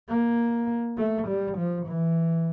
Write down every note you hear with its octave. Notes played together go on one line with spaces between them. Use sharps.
A#3
A3
G3
F3
E3